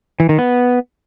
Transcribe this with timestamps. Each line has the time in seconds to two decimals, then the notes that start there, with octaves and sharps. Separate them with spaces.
0.20 E3
0.29 D#3
0.39 B3